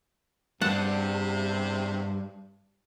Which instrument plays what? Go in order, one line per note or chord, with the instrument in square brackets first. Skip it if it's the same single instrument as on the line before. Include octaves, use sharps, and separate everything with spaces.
[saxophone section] E2 C3 [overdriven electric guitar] G2 [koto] F#5 A5